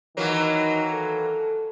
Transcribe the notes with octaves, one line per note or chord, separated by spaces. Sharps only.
D#3 E3 F#3 A#3
A4